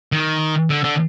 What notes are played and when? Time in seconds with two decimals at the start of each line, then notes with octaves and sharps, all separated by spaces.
0.12 D#3
0.70 D3
0.84 D3